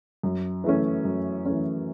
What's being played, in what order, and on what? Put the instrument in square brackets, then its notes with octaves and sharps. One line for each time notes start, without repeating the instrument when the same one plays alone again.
[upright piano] F#2
E3 A3 C#4
F#2
E3 A3 C#4